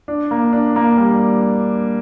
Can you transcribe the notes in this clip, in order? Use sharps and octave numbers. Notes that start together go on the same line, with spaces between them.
D4
A#3
D4
A#3
G3